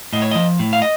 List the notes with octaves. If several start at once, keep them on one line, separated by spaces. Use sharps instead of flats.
A2 D#5
C#5
F3 D#5
A2
F5
D#5